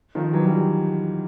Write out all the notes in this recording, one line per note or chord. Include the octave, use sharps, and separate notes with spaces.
D#3 F3
E3 F#3
F3 G3